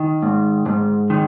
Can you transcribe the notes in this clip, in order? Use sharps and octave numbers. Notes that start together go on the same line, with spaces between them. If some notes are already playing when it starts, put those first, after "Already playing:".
Already playing: D#3
G#2
G#2
D#3